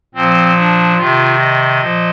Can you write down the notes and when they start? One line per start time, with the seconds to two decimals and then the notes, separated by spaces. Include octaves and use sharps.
0.15 A#2 F3 C4
0.56 D4
0.97 C3 D#3 F4
1.39 D#5
1.80 A#2 F3